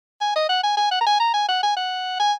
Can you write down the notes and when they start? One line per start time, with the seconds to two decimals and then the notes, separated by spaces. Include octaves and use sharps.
0.21 G#5
0.36 D#5
0.49 F#5
0.63 G#5
0.77 G#5
0.91 F#5
1.01 A#5
1.07 G#5
1.20 A#5
1.34 G#5
1.48 F#5
1.63 G#5
1.76 F#5
2.20 G#5